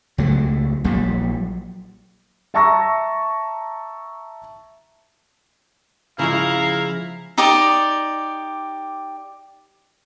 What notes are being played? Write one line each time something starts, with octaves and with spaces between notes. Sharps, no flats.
C#2 F#3 A3
A#1 A#2 F#3 G3
E5 A5 A#5 C#6 E6 A#6
C#3 F3 G#3 E4 F5 A#5
D#4 G4 D5